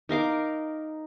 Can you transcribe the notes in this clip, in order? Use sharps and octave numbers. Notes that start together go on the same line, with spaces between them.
D#4 A#4 F5 D6